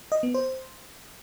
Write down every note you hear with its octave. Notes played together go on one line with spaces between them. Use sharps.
D#5
B3
C5